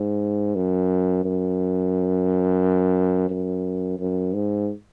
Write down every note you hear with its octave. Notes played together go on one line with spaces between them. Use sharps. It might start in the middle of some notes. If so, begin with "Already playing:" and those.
Already playing: G#2
F#2
F#2
F#2
F#2
G#2